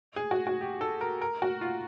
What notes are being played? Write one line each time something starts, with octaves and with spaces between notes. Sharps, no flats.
G#4
F#4
F#4
G4
A4
A#4
A#4
F#4
F4